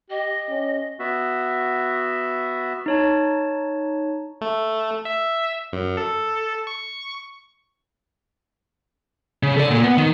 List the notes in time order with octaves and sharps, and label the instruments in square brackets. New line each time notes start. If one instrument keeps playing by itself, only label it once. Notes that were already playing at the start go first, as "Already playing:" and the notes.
[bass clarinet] G4 [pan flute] D#5
[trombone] C#4
[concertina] B3 F#4 E5
[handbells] D#4 C#5 A5
[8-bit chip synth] A3
E5
F#2
A4
C#6
[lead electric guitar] C#3
A4 D5
A#2
B3
D#3